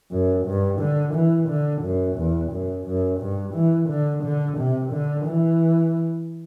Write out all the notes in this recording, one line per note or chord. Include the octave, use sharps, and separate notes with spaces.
F#2
G2
D3
E3
D3
F#2
E2
F#2
F#2
G2
E3
D3
D3
C3
D3
E3